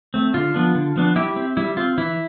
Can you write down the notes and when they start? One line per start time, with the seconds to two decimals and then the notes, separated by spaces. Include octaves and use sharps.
0.14 A3 C4
0.34 D3 F4
0.54 F3 B3 D4
0.75 D3
0.96 F3 B3 D4
1.16 G3 E4 G4
1.36 C4
1.57 G3 E4
1.77 C4 F4
1.98 E3 E4